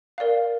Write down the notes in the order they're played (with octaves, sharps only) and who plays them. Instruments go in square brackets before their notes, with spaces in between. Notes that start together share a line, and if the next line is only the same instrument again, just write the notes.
[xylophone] A#4 D5 F5